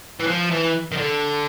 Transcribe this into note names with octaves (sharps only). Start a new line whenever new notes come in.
E3
F3
E3
D#3
D3